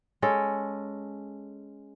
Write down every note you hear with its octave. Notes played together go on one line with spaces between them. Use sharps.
G#3 C#4 A4